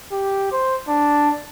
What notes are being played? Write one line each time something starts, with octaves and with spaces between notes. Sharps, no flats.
G4
C5
D4